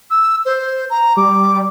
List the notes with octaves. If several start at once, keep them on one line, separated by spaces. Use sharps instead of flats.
E6
C5
A#5
G3 D6